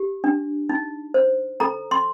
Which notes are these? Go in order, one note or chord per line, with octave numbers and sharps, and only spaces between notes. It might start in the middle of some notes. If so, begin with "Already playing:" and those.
Already playing: G4
D4
D#4
C5
A4 A#5
C6